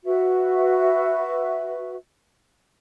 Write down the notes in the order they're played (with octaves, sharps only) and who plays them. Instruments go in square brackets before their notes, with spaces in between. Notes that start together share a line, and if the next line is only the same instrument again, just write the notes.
[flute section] F#4 B4 E5